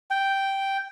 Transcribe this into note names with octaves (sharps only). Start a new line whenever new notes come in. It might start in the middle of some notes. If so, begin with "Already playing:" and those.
G5